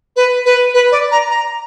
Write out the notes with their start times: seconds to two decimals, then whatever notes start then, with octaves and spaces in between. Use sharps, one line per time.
0.16 B4
0.46 B4
0.74 B4
0.92 D5
1.12 A#5
1.31 A#5